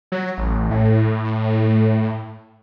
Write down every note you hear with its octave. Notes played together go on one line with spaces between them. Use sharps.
F#3
A1
A2